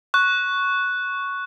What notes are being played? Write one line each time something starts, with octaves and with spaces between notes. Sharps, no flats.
C#6 F#6